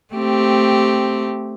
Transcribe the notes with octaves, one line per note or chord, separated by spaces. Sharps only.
A3 C4 G4